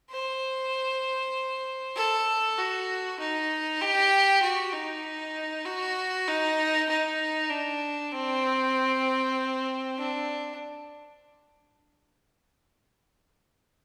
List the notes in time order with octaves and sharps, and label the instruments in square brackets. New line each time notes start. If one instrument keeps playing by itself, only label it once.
[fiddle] C5
A4
F#4
D#4
G4
F#4
D#4
F#4
D#4
D#4
D4
C4
D4